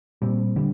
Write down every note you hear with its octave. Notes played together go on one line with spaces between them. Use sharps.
A#2 G3 C4
D3 G3